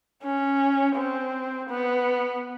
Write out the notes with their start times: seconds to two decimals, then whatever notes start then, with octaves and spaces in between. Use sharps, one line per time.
0.23 C#4
0.96 C4
1.69 B3